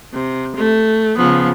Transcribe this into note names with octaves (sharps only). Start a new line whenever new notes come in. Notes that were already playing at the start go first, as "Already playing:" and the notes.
C3
A3
C#3 F3 B3